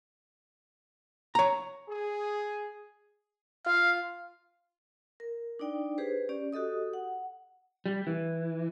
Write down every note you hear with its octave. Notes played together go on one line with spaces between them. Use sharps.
C#5 A#5
G#4
F4 F5
A#4
D4 D#4 D5 G5
G4 G#4 B4 C5
C#4 G4 D5
F#4 G4 A4 D#5 D#6
F#5
G3
E3